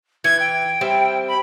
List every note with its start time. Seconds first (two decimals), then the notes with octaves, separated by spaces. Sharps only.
0.24 E3 G#6
0.40 G5
0.81 G3 C4 E5
1.28 B5